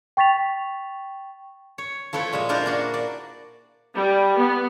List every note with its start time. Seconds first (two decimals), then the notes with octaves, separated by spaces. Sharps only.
0.17 G5 C#6 A6 B6 F7
1.78 C#5
2.13 F3 A3 E4 B4 C#5
2.33 A#2 G#3 A#3 E5
2.49 D4 E4 F4 A#4 C5
2.66 A#3 D4 F#4
2.94 D5
3.95 G3
4.36 B3